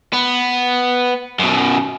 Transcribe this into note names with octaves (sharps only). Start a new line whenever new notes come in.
B3
F#2 B2